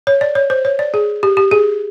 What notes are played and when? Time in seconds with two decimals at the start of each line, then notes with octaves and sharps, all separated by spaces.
0.07 C#5
0.21 D5
0.35 C#5
0.50 C5
0.65 C#5
0.79 D5
0.94 G#4
1.23 G4
1.37 G4
1.51 G#4